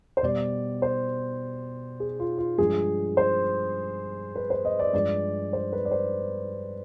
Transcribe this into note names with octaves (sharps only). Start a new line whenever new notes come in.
C5
B2 G3 D5
C5
G#4
F4
F4
G2 F3 G#3 G#4
C5
B4
C5
D#5
D5
G2 F3 G#3 D5
C5
B4
D5
C5